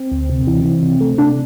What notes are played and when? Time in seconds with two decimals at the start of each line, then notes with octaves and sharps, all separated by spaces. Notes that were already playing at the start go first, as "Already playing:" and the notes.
Already playing: C4
0.11 D2
0.30 C3
0.47 E3
0.65 E3
0.83 C3
1.01 A3
1.18 C3 D4